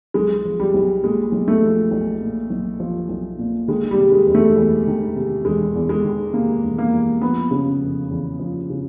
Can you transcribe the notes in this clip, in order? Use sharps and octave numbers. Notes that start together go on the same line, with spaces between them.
B1 G#3
F3
G3
B1
A#2 G#3
B1
A3
F3
B1
A#2
B1
F3
B1
A#2
D#3 G#3
G3
C3
G#3
E1
A3
E2
D#3
C3
E1 G#3
E2
G#3
D#3
C3 A#3
E1
A#3
E2
F3 B3
C#3
F1
E2
F3
C#3